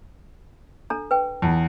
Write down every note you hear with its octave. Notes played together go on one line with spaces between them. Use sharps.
D4 A4 A#5
B4 G5
E2 F4 A5